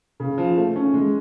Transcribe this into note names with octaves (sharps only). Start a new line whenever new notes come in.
C#3
F3
A3
C#4
G#3